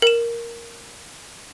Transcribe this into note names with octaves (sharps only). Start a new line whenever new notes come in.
A#4 E7